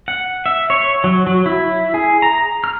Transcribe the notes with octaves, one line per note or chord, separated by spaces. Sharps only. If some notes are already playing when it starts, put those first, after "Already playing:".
F#5
E5
C#5
F#3
F#3
E4
G#4
A#5
F6